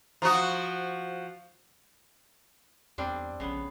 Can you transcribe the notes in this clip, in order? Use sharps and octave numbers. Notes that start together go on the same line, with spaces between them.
F3 F#4 A#5 D#6
E2 G3 C4 D4
A#1 C#3 B3